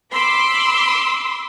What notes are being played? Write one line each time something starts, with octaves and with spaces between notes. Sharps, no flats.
B5 C6 D6 E6